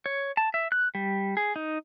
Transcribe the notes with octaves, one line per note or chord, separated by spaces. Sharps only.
C#5
A5
E5
F#6
G3
G#4
D#4